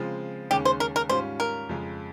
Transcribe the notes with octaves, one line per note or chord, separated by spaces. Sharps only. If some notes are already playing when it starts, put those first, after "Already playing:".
Already playing: C#3 F3 G#3 C4 F4
D#2 C#3 G#3 C#4 G4
C5
A#4
A#4
G#2 G3 C#4 F4 C5
A#4
F2 C#3 G#3